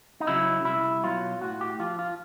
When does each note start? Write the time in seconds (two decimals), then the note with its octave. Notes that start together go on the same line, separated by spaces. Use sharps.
0.20 D#4
0.27 C#3 F#3 E4
0.65 C2 E4
1.03 B2 F#3 F4
1.42 A2 F#4
1.61 G4
1.79 F3 F4
1.99 F4